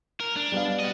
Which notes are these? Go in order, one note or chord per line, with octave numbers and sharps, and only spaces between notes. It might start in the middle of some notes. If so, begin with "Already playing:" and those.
A#4
D4
G3 B3 F5
F#4 D#5